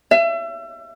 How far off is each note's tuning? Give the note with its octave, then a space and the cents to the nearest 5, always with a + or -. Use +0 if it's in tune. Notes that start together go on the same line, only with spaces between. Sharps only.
E5 +35